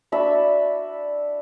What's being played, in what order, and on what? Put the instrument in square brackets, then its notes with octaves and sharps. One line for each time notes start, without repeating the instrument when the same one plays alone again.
[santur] D4 F#4 E5 B5